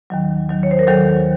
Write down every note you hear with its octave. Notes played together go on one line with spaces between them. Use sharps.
D#2 D#3 F#3
D#2 D#3 F#3
C#5
C5
A#4
D#2 D#3 F#3 A4